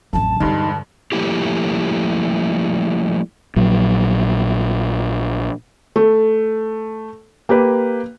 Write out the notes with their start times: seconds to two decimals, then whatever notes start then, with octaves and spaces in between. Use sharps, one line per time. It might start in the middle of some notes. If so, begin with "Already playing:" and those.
0.13 A1 F2 F#3 A5
0.40 E1 G2 D3 B3 D#4 C6
1.12 F3 G3 A3 A#3 E4 G4
3.56 A#1 A#2 F#3
5.96 A3
7.49 A#3 G4 B4